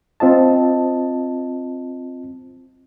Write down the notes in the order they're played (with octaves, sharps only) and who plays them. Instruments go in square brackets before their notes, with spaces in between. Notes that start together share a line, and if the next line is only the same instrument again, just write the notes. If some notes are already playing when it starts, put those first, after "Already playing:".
[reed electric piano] C4 F4 D#5 A5